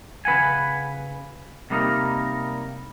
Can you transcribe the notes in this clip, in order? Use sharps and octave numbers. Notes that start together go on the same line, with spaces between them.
C#3 B4 F#5 G#5
C3 G3 A#3 D#4 A#4